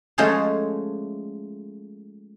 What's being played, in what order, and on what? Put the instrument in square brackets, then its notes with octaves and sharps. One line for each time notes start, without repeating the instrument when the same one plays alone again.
[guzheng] F3 G#3 A3 C#4 G#4 C5